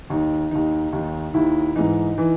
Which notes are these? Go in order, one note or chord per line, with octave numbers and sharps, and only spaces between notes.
D#2 D#3 D#4
D#2 D#3 D#4
D#2 D#3
D#2 D#3 E4
G#2 E3 D#4
E3